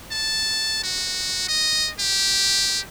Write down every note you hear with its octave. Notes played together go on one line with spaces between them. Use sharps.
A5
F#4
D#5
G4